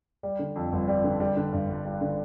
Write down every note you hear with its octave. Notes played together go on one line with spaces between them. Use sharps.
G3
D3
F2
G1
G3
D3
G3
D3
G2
G1
G3
D3